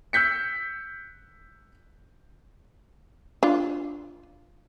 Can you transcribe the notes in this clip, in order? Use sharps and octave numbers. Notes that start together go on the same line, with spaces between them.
E6 F#6 G6 B6 C#7
D4 F4